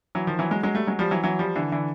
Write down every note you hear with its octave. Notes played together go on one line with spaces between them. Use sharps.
E3 F#3
D#3 F3
E3 F#3
F#3 G#3
F#3 G#3
G3 A3
F#3 G#3
F3 G3
E3 F#3
E3 F#3
F3 G3
D3 E3
D3 E3